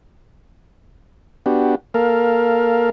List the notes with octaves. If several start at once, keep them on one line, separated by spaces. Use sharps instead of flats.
B3 D4 F#4 G4
A#3 A4 A#4 F5